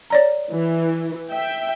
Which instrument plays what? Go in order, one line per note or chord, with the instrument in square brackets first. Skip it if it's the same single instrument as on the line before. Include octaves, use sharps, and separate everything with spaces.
[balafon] C#5 D5 A#5
[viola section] E3
E5 G5